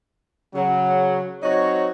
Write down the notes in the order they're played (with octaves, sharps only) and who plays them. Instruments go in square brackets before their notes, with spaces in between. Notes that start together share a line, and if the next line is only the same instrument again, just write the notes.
[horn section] C#3 F#3
F#3 C4 D#4 F#4 C#5